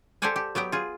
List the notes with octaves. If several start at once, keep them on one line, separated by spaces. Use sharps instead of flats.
G4 A4 C5 D5 F#5 G#5
G4
F#3 B3 G4 G5
F4 G#4